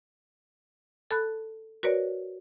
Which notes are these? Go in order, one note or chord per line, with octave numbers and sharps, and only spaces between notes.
A4 A5 B5 F#6
F#4 A#4 B4 C#5 D5